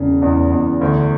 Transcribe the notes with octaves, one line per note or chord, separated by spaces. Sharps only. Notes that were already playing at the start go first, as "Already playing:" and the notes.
Already playing: E1 C#3
E2
E2
D2